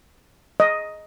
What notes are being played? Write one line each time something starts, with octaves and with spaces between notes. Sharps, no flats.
D#5